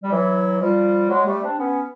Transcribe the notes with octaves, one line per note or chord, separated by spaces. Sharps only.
G3
E3 F#3
F3 G3
F#3 G#3
G3 A3
C4 D4
B3 C#4